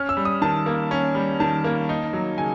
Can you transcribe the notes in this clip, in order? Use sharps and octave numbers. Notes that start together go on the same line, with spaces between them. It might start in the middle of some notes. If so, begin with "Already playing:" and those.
Already playing: C#4 F6
E6
G3
D#6
D#3 A5
A#3
C#4
G3
D#3 A5
A#3
D#4
F#3
C#3 G#5